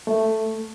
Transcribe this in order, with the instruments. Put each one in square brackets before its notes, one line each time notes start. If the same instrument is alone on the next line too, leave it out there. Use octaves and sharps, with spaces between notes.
[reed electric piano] A3